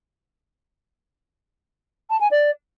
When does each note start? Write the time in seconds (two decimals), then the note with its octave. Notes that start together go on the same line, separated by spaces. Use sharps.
2.10 A5
2.20 G#5
2.31 D5